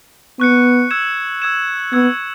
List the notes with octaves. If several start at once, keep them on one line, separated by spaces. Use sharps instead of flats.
B3 C#6 F#6 C#7
E6 G#6 E7
E6 G#6 E7
B3 C#6 E6 G#6